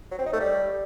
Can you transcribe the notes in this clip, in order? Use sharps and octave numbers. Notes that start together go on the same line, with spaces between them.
F#3
C4
D#4
A3
G3